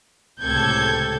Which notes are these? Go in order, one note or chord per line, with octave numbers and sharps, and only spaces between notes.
C#2 A2 C3 A4 G6 G#6